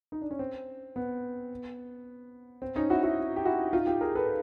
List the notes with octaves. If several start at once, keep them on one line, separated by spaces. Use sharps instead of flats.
D#4
D4
C#4
C4
B3
C4
C#4 D#4
E4 F#4
E4 F#4
G4
E4 F#4
D#4 F4
F4 G4
G#4 A#4
A4 B4